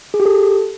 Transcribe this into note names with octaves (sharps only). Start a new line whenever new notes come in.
G#4
G4
A4